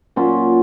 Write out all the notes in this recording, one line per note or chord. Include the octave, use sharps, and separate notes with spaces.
A#2 F#3 C#4 F4